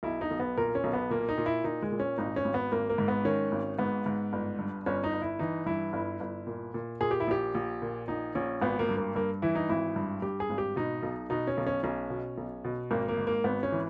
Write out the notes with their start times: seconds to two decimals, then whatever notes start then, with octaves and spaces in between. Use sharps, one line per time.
0.03 B1 E4
0.21 D#4
0.31 B1
0.40 B3
0.57 A#2 A#4
0.75 C#4
0.84 B1
0.93 B3
1.10 A#2 A#3
1.29 D#4
1.38 A#2
1.46 E4
1.64 A#2 D#4
1.82 G#3
1.92 A#2
2.00 C#4
2.18 G#1 D#4
2.36 C#4
2.45 G#1
2.54 B3
2.72 G#1 A#3
2.89 A#3
2.98 G#2
3.08 B3
3.25 D#3 C#4
3.52 G#1
3.79 G#2 B3
4.06 G#2
4.33 G1
4.59 G2
4.86 G1 C#4
5.04 D#4
5.13 G1
5.22 E4
5.39 E3 D#4
5.66 G2 E4
5.93 G1 E4
6.20 G1
6.47 A#2
6.74 A#2
7.01 A#2 G#4
7.11 G4
7.20 E4
7.27 A#1 G4
7.55 A#1
7.82 A#2
8.08 A#1 D#4
8.35 A#1 C#4
8.62 G#1 B3
8.79 A#3
8.89 G2
8.97 A#3
9.15 G2 A#3
9.42 E3 E4
9.55 D#4
9.69 G#1 E4
9.96 G2
10.22 G2 G4
10.40 G#4
10.50 G#1
10.58 G4
10.76 B2 D#4
11.03 B1
11.30 B2 D#4
11.47 C#4
11.58 B1
11.66 C#4
11.83 B1 C#4
12.10 B2
12.38 B1
12.64 B2
12.91 G#1 A#3
13.08 A#3
13.17 G#2
13.27 A#3
13.44 G#1 B3
13.63 C#4
13.72 E3